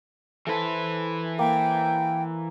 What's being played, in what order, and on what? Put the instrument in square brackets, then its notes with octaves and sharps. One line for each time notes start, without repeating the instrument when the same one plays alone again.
[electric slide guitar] E3 B4 [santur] A4 C5 A5
[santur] A#3 [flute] G5